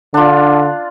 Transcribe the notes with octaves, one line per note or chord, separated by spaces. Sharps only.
D3 D4 F4